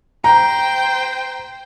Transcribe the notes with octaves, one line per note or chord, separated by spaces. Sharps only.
C5 G5 A#5